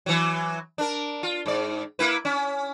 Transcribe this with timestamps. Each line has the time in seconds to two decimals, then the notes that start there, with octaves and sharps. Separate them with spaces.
0.06 E3 F#3
0.78 D4 A#4
1.23 F4
1.46 G#2 D5
1.99 A#3 E4 B4
2.25 C#4